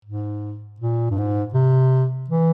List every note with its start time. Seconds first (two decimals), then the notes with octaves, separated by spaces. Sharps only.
0.05 G#2
0.80 A#2
1.10 G2
1.17 G#2
1.54 C3
2.29 E3